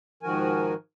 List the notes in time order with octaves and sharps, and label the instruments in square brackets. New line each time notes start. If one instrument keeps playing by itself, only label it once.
[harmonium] G#2 D#3 F3 F#4 A#4 G#5